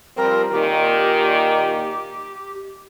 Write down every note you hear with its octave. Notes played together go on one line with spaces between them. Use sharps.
F3 G3 C4 A#4
A#2 D#3 G4